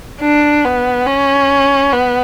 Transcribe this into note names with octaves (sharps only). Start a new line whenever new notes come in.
D4
B3
C#4
B3